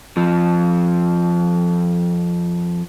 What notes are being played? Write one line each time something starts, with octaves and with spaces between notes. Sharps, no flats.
F2 F3